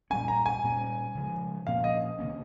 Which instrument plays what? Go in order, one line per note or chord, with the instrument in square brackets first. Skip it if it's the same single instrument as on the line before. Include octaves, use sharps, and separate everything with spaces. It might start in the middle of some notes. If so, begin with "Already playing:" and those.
[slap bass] A#2 G3 C#4 [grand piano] G#5
[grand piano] A#5
G#5
[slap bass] A#2 G3 C#4
C#3 F3 G#3
[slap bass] A#2 F3 A#3 C#4 [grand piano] F5
[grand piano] D#5
[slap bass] C3 D#3 A#3 C#4